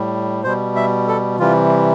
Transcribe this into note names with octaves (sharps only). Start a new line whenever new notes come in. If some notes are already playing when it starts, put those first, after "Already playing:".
Already playing: A2 G3
B2 G3 C5
E5
A4
C3 E3 G3 F4